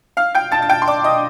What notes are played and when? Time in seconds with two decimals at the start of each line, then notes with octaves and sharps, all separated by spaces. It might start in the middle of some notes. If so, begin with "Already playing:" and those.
0.17 F5 F6
0.35 G5 G6
0.52 A5 A6
0.62 A6
0.69 G5 G6
0.82 C6
0.88 D5 D6
1.04 D#5 D#6